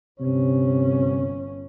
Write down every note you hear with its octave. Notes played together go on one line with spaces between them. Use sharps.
G1 C3 C#4